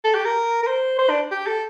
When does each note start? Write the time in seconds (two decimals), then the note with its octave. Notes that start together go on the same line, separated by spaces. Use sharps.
0.04 A4
0.15 G4
0.25 A#4
0.63 A#4
0.67 C5
0.99 C5
1.10 D4
1.31 G4
1.47 A4